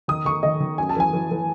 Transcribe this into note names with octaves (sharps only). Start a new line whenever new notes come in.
D#3 D#6
D#3 C#6
D#3 D#5
D#3
F#2 G#5
A5
E3 G#5
E3
E3